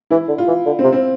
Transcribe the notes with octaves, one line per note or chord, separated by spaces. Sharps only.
E3 E4
D3
F4
E3
D3
C4
C3
C4